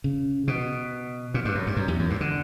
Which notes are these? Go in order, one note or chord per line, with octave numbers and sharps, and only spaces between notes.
C#3
B2
A#2
G2
F#2
G2
F#2
E2
F#2
G2
D3